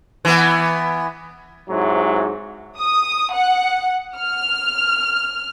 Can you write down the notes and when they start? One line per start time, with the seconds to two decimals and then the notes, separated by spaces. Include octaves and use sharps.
0.25 E3 B3
1.70 G#2 C3 F#3 E4
2.79 D#6
3.34 F#5
4.19 F6